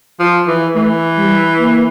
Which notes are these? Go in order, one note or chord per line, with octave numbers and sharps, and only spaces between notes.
F3
E3
E3 A3
G3
A#3